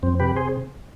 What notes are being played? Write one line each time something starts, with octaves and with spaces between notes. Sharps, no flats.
F2 C4
C3 G4 B4
G#4 C5